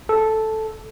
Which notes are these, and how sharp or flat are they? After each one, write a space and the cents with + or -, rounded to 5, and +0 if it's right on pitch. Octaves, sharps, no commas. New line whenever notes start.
A4 -5